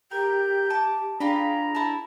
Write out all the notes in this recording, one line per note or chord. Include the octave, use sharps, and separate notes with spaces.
G4 A#4 G5
A5 D6
D4 F4 G4 G#4 A#5 B5
E4 A5